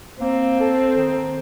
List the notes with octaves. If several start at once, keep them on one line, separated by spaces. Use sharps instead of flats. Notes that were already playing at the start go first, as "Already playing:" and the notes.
A#3 C4
A4
D#3